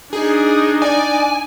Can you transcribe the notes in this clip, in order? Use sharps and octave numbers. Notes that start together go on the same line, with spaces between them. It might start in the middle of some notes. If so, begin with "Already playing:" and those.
D4 D#4 G#4
D5 G#5